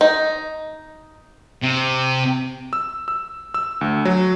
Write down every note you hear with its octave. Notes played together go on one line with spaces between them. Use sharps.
D#4
C3
E6
E6
E6
D2
F#3